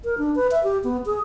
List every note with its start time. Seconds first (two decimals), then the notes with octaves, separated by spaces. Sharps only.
0.04 A#4
0.18 D4
0.35 B4
0.51 E5
0.63 G4
0.84 B3
1.06 G#4